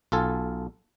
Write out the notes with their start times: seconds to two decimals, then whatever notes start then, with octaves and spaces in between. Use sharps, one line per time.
0.12 B1 F4 A4 G#5